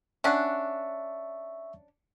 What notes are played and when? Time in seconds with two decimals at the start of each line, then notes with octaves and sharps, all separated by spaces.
0.24 C#4 D4 E5 F#5 C#6